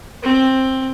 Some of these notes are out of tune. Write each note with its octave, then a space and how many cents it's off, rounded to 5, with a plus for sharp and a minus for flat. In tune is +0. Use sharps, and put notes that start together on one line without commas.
C4 +10